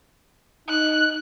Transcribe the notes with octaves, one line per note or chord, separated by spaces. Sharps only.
D#4 F#6